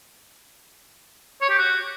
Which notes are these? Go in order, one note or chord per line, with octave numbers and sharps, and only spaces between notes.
C#5
G4
F#4